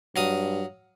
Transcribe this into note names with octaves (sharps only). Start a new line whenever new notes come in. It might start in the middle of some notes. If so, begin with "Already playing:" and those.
G2 F#3 F5 D#6